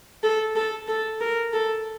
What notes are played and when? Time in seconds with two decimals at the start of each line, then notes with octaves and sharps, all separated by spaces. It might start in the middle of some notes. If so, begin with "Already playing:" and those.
0.23 A4
0.56 A4
0.88 A4
1.21 A#4
1.53 A4